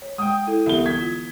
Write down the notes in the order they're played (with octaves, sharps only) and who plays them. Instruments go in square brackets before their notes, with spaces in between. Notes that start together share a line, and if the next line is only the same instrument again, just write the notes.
[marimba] C#5
[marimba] G#3 [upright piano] G5 D#6
[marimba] E4 A4
[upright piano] C2 G7 [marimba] D3 E3 B3
[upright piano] G#6 B6
[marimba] F4